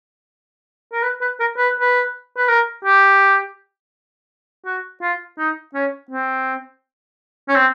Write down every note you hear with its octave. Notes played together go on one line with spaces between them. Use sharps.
A#4
B4
B4
A#4
B4
B4
B4
A#4
G4
F#4
F4
D#4
C#4
C4
C#4
C4